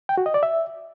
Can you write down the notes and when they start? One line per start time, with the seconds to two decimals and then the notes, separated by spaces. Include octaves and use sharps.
0.09 G5
0.18 F#4
0.26 D#5
0.34 D5
0.43 E5